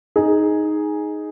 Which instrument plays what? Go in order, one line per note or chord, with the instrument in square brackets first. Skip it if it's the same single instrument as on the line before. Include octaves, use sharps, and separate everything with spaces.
[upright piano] D#4 G#4